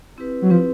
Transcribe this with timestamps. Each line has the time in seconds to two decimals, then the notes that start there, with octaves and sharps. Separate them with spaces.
0.18 C4 E4 G4 B4
0.42 F#3
0.50 F3 C4 E4 G4 B4